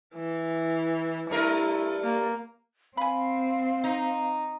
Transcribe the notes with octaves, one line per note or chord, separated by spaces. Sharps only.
E3
G2 A3 E4 A#4
A#3
C4 F5 G#5 B5
D#4